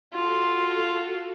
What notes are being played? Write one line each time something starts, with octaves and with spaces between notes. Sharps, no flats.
F4 F#4 A4 C6